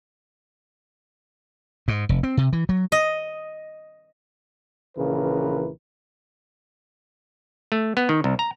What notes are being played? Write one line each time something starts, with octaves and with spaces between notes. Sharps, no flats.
G#2
F1
C4
C3
E3
F#3
D#5
A#1 C#3 E3 A#4 B4
A3
B3
D#3
C2
A#5